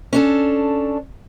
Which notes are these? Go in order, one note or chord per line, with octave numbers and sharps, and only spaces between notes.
C#4 D4 A4